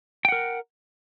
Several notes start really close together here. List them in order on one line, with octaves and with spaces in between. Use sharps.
G5 F#5 A#4